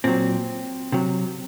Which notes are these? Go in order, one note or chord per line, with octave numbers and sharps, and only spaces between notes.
A#2 F#3 C4
C3 F#3